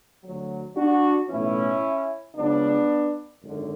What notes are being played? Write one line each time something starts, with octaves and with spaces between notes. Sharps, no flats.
D2 D3 F#3
D4 F#4
B1 A2 E3 C#4 E4
C#2 C#3 F#3 B3 D4
G#1 F#2 D3